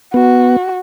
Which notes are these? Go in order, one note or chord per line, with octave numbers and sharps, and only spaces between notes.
B3 F#4